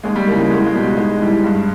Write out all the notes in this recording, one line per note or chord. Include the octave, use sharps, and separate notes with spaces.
D#2 G#3
G3
C#3 E3 A#3
G#3
E2 G#3
G#3
B2 G3
G#2 G#3
E3 G3
G2